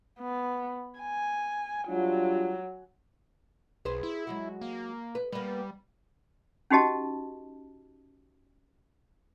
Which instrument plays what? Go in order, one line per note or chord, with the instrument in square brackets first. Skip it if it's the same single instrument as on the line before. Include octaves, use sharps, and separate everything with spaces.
[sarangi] B3
G#5
[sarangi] F#3 [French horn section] G3 D4 F4
[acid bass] B1 [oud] G#4 B4 C5
[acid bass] E4
[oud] F#3 G#3 F#4
[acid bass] A#3
[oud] B4
[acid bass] G3 [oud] A#3 B3
[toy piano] C#4 D#4 F#4 G4 D#5 A5